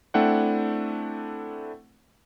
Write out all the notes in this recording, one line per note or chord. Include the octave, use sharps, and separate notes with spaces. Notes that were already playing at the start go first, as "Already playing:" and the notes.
A3 C4 D4 E4 F#5 G5